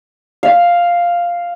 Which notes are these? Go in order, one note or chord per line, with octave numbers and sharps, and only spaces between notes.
F5